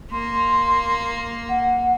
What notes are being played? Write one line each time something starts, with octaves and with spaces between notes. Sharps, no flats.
A#3 C6
F#5